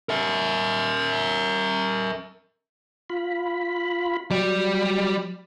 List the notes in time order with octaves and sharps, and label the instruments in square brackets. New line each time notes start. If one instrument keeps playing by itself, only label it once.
[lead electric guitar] A#4 E5
[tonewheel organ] F4 B5
[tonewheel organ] F#3 [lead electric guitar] G3 D5